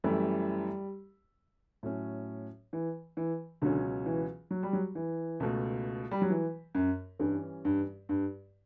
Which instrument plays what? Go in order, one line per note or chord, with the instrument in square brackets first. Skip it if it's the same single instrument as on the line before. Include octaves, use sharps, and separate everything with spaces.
[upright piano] F#2 E3 A3 E4 A4 [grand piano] G3
[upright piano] A2 F#3 C#4
[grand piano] E3
E3
[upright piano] C#2 B2 F#3 C#4 [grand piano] D3
[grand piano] E3
F#3
G3
F#3
E3
[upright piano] C#2 B2 A3
[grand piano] G3
F#3
E3
F#2
[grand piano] G2 [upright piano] E3 G3 C#4
[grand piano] G2
G2